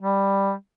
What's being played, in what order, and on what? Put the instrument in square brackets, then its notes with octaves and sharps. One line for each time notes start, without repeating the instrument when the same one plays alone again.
[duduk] G3